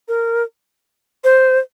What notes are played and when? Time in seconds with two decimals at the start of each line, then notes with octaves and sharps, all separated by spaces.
0.08 A#4
1.24 C5